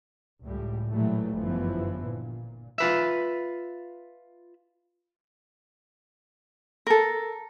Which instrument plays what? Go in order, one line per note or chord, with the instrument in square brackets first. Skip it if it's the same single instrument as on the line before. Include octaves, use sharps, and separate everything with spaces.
[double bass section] C#2 A2 G3
A#2 E3 F#3 G3 A3
G1 F#2 E3 F3 B3
A#2
[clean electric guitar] F4 B4 E5
[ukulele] A4 A#4